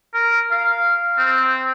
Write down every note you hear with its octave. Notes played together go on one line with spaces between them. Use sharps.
A#4
F5
C4